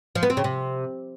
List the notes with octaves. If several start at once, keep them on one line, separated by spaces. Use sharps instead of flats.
F3
B3
C4
C#3
C3